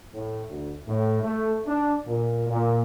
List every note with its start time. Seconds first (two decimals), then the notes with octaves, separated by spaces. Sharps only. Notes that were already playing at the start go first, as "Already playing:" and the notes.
0.13 A2
0.50 D2
0.88 A2
1.22 A3
1.67 D4
2.07 A#2
2.50 A#2